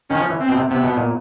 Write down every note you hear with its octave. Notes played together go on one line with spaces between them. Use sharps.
D#3 C#4
F3
E3
C4
B2
C3
C3 B3
B2
A#2